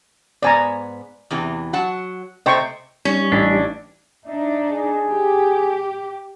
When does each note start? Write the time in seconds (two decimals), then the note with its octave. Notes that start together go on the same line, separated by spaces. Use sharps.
0.43 G#2 B3 D5 G#5 A#5
1.30 E2 C3 E3
1.73 F#3 F#5 A5
2.46 C3 A3 C5 D#5 G5 C#6
3.05 G3 C#4 D#4
3.32 A1 D4 B6
4.26 D4 D#4 E5
4.71 G#4
5.09 G4